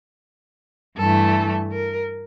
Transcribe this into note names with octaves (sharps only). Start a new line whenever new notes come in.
G2 E3 A3 A4
A#4